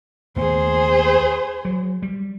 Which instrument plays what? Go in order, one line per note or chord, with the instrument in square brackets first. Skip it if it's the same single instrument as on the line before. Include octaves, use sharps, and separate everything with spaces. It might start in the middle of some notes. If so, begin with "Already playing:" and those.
[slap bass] D#2 A3 B3 [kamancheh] G#4 C5
[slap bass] F#3
G3